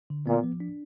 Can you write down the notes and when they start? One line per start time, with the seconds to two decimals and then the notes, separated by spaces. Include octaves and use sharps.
0.10 D3
0.26 A#2 B3
0.43 F3
0.60 D4